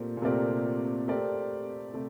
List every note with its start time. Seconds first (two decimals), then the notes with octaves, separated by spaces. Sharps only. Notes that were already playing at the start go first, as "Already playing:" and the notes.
Already playing: A#2 A3 C4 G4 A#4 D5
0.17 A#2
0.22 C3 A3 C4 G4 A#4 D5
1.08 A3 C4 G4 A#4 D5
1.94 C3 A3